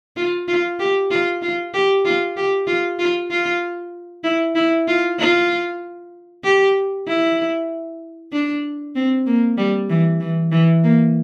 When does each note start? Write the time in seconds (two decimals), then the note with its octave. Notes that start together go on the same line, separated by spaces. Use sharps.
0.16 F4
0.48 F4
0.79 G4
1.11 F4
1.42 F4
1.74 G4
2.05 F4
2.37 G4
2.67 F4
2.99 F4
3.31 F4
4.24 E4
4.55 E4
4.88 F4
5.19 F4
6.44 G4
7.07 E4
8.33 D4
8.96 C4
9.26 A#3
9.57 G3
9.90 E3
10.20 E3
10.52 E3
10.84 A#3